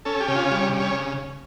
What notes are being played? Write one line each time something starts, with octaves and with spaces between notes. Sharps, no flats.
C#4 A4
G4
C#3
F4
G3 C#5
C#3
C#5